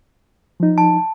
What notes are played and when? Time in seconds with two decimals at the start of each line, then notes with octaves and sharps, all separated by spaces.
0.60 F3 D#4
0.78 A5